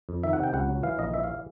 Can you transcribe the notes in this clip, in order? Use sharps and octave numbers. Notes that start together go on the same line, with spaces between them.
F2
D#3 E5
F#5
C3 G5
C#2 F#5
F#3
E3 F5
A#1 D#5
E3 E5
F5